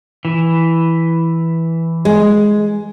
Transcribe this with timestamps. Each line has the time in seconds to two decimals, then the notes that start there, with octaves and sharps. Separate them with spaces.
0.25 E3
2.05 G#3